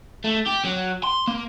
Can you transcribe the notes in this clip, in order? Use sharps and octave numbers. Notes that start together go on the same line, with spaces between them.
A3
G4
F#3
C6
A#3